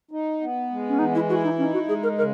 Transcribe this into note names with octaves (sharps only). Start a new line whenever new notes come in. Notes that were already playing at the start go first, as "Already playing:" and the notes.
D#4
B3
G#3
C#4
E3 D#4
E4
E4 F#4
D#4
C#4 D#4
F#4
G#3 G#4
A#4
C#3 A#4